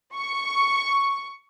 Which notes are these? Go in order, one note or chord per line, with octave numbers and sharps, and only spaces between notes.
C#6